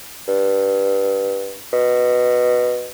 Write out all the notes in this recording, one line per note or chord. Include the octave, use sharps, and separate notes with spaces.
G2
B2